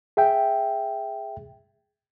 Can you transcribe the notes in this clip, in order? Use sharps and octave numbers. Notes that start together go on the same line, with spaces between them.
G#4 E5 G5